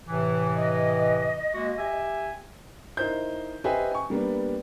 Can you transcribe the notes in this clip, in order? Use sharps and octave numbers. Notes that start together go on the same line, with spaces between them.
A2 C3 E3
D#5
G#3 A#3 F#4
G4 E5 G#5
D#4 E4 A#4 C5 G6
G4 B4 C5 D#5 E5 G#5
G#5 C#6
G3 A#3 B3 D4